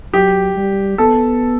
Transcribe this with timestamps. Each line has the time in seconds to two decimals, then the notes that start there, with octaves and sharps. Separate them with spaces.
0.13 F#3 G4
0.56 G3
0.98 B3 A4